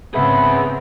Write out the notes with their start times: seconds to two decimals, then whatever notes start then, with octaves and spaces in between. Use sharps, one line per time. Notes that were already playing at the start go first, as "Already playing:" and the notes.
0.14 G#2 C#3 B3 C4 G#4 E5 B5